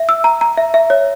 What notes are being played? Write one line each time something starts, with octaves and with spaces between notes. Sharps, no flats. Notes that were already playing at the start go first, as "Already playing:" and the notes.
Already playing: E5
E6
A#5
A#5
E5
E5
C#5